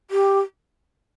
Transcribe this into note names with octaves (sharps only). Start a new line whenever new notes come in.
G4